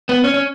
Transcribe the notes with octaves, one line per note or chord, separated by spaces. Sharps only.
B3
C#4
C#4